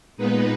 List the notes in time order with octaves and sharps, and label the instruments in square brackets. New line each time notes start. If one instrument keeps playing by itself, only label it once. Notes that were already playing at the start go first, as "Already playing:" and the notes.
[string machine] A#2 G#3 B3 D#4 B4